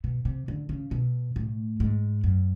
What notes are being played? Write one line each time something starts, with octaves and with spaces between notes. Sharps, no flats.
B2
C3
D3
C#3
B2
A2
G#2
F#2